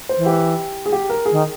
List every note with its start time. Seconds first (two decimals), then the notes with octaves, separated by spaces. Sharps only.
0.09 C5
0.17 E3
0.26 G4
0.86 G#4
0.92 G4
1.10 A#4
1.26 G#4
1.31 D#3